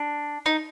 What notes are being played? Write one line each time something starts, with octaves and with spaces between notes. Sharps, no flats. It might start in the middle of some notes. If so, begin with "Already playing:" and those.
Already playing: D4
D#4